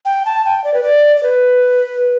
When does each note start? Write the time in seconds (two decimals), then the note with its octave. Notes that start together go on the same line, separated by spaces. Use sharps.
0.05 G5
0.26 A5
0.45 G5
0.64 D5
0.74 B4
0.83 D5
1.17 D5
1.23 B4